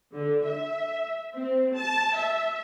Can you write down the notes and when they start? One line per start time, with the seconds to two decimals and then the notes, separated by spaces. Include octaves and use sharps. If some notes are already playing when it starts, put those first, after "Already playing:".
0.13 D3
0.45 E5
1.34 C4
1.75 A5
2.15 E5